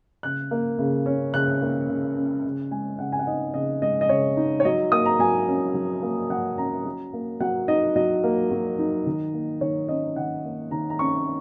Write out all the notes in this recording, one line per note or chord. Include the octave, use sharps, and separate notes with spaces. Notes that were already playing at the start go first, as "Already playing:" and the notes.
C#3 F#6
A#3
C#3
C#4
C#3 F#6
A#3
C#3
C#4
C#3
G#3 G#5
C#3 F#5
G#5
F#5
D#4 D#5
C#3 D#5
G#3 D#5
D#5
C#3 C#5
D#4
C#5
F#3 D#5
A#3 D#6
A#5
F#3 G#5
C#4
F#3
A#3
F#3 F#5
C#4 A#5
F#3
A#3
F#3 F#5
D#4 D#5
F#3 D#5
A#3
F#3
D#4
D#3
A#3
D#3 C#5
C#4 D#5
D#3 F#5
A#3
D#3 A#5
A#5
C#4 C#6